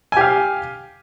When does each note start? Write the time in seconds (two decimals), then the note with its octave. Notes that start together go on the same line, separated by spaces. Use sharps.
0.12 G#5
0.17 G4
0.21 F5